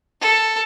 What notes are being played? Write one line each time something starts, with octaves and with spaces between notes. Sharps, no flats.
A4